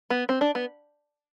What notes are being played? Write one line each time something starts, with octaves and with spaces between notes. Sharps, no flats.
B3
C4
D4
B3